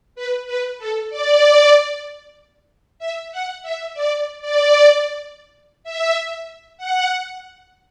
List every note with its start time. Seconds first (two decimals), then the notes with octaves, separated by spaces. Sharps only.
0.15 B4
0.46 B4
0.78 A4
1.10 D5
2.99 E5
3.31 F#5
3.63 E5
3.94 D5
4.41 D5
5.83 E5
6.77 F#5